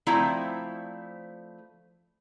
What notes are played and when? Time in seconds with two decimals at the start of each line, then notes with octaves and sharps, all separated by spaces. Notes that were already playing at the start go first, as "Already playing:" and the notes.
0.07 F3 A3 C4 E4 D5 A#5